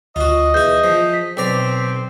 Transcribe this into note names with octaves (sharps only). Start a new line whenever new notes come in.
D2 F4 F#4 D#5
E2 E4 G6
F3
B6
B1 C4 D5 A#5